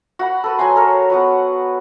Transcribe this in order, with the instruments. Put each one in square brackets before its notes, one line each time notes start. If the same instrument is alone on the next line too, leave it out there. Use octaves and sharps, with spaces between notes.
[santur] F#4 F#5 B5
A4 B4
F#3 B4 G#5 C6
A4 A#4 C#5
B3 F#4 B4